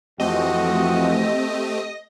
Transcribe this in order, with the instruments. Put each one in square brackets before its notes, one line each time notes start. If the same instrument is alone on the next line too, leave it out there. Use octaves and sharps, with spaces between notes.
[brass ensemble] F2 E3 F3 [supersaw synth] A3 C4 G4 [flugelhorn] F#4 [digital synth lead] D#5